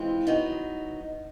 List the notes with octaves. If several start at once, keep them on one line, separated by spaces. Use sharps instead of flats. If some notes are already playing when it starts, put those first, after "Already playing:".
Already playing: E3 G#3 C4 F4
F#3 B3 D#4